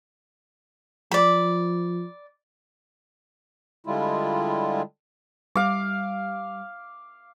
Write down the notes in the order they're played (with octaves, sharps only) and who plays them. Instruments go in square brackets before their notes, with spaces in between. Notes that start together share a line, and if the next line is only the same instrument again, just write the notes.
[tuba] F3 [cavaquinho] D5 B5
[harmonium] D3 G3 G#3 E4 F4
[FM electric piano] G3 [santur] F5 D6